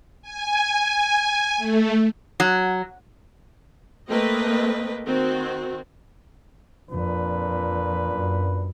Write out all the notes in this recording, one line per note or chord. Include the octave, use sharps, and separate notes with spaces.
G#5
A3
F#3
A3 A#3 C4 B4 D#5
D#3 C4 F#4
F2 A#2 D4 B4
F#2